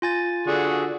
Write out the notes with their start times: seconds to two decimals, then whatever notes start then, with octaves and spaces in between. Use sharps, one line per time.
0.02 F4 G#5 A6
0.47 D3 F#4 G#4